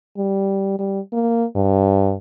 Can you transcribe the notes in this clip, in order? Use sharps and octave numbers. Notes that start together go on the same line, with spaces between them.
G3
G3
A#3
G2